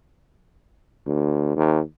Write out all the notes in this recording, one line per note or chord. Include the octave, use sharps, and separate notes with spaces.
D2
D#2